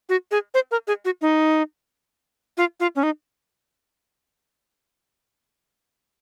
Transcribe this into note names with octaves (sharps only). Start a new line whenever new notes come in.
F#4
G#4
C5
A#4
G#4
F#4
D#4
F4
F4
C#4
D#4